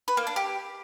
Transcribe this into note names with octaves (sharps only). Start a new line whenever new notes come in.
B4
A#3
D4
G4